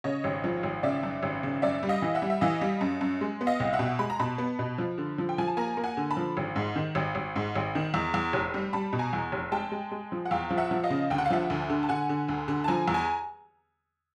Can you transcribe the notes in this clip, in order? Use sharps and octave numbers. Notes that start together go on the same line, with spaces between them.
C#3 C#5 D#5
G#1
F3
G#1
C#3 D5 E5
F#2
G#1
C#3
F#2 D5 E5
G3
D#5 F5
E3
E5 F#5
G3
E5
E3 D#5 F5
G3
F#2
F#2
G#3
B3
D#5 F5
C2
E5 F#5
B2
G#3 B5
A#5
B2 A5 B5
B3
B2
F3
D3
F3
G5
F3 G#5
A5
A#3 G#5 A#5
A#3
F#5 G#5
D3
A5 B5
F3
G#1
G#2
D#3
G#1
G#1
G#2
G#1
D#3
E2
E2
F1
G3
G3 A5 B5
B2
G#5 A#5
E2
F1
G#3 G5 A5
G#3
G#3
F3
F#5
E2 F5 G5
F3
E5 F#5
F3
D#5 F5
C#3
D2 G5
F#5
F5
F3 E5 F#5
D2
D3
A5
D3 F#5 G#5
D3
D2
D3
A5
F3 G#5 A#5
E2
G#5 A#5